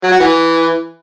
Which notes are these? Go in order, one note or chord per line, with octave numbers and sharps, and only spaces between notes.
F#3
F#4
E3